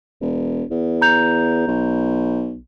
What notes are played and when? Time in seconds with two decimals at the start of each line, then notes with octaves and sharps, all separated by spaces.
0.21 E1
0.71 E2
1.02 A#5 G6 F7
1.67 B1